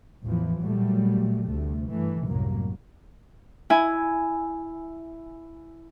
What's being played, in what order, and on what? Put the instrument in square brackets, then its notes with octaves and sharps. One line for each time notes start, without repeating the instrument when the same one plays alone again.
[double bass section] A1 E2 E3 F3
A#2 F#3 G3 A3
D2 C3 A3
G2 E3 A3
C2 F#2 A2 F#3 A#3
[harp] E4 G#5